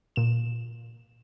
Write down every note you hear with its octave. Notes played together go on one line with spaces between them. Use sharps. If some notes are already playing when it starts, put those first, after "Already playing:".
A#2 E7